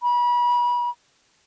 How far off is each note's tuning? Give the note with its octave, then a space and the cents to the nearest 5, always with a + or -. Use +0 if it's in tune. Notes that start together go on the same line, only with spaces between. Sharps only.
B5 -35